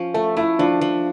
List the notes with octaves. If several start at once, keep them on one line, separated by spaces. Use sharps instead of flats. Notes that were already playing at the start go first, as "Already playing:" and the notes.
Already playing: F3 C#4
A3 A4
A3 E4
F3 D4
F3